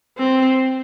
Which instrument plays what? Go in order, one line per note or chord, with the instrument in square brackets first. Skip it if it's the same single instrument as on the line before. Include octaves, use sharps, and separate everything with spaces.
[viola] C4